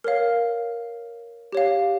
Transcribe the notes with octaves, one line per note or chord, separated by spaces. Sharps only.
A#4 C#5 F5
G4 C#5 F5